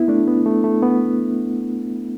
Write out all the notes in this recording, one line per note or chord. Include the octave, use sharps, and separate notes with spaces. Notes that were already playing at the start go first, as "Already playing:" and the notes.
Already playing: B3 E4
A3 D4
B3
A3
A3
B3